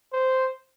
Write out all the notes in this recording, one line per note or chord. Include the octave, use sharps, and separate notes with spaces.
C5